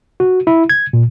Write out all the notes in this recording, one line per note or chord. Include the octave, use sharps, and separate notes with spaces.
F#4
E4
G#6
A#2